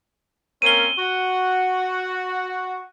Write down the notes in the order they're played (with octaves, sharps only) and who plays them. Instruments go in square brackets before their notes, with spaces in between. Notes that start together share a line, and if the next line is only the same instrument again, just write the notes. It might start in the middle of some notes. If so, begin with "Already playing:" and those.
[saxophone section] A#3 C4 C#4 [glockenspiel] D#7 G7
[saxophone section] F#4